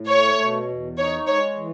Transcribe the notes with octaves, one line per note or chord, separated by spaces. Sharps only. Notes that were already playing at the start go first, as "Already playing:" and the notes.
Already playing: A2
A3 C#5
B2
E2
D#4 C#5
G#3 C#5
E3